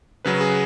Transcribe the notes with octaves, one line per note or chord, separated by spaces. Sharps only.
C#3 F#3 B4
G#4